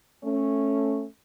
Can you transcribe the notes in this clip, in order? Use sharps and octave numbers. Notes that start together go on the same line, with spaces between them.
A3 C#4